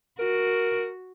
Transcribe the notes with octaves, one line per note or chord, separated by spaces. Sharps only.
F#4 A#4